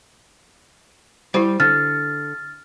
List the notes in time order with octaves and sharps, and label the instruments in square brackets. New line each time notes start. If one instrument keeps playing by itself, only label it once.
[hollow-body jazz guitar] G3 [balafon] E4 G4 C5
[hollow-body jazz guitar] D3 [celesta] F6 A6